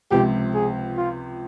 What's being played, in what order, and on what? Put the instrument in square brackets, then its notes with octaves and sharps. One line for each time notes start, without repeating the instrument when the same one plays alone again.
[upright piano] C#2 C3 F3 [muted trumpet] G4
[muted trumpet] G#4
F4